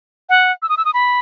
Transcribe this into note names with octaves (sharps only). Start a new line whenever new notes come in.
F#5
E6
D#6
E6
D#6
B5